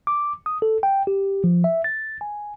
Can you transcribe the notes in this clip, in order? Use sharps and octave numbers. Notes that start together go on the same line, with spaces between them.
D6
D#6
A4
G5
G4
F3
E5
A6
G#5